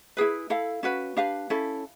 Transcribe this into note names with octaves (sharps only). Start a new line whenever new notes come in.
E4 G#4 B4
E4 A4 F5
C#4 F#4 B4
D4 G4 B4 F5
C#4 E4 A4